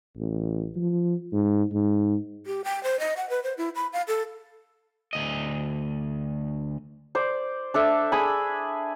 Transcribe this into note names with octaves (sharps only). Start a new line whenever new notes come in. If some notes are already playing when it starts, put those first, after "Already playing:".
A1
F3
G#2
G#2
G4
G5
C5
D#5
F#5
B4
C5
E4
B5
F5
A4
D2 D#5
C5 D5
D4 A4 E5
G#4 G#5 B5